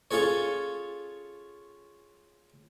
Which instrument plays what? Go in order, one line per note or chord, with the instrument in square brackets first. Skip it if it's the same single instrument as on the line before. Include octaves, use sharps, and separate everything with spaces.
[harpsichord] C#4 F4 G#4 A4 C#5